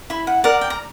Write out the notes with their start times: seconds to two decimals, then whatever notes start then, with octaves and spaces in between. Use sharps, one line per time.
0.10 E4 B5
0.27 F#5
0.44 A#4 D5 F#5
0.61 G5
0.70 A#5